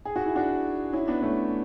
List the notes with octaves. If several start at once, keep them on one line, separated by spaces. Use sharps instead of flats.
G#4
F#4
E4
D4 F#4
C#4 E4
B3 D4
A3 C#4